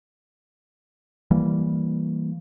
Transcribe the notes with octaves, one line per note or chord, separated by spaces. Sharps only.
E3 G3 A#3